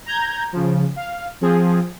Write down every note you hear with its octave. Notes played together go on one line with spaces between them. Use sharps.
A#5 G6 G#6
C#3 F3
F5
F3 C4 G#4